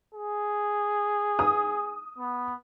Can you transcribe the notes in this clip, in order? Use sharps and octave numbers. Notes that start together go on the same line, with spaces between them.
G#4
D#6
B3